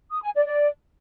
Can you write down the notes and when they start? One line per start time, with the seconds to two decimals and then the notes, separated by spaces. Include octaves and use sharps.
0.11 D#6
0.22 G#5
0.34 D5
0.46 D5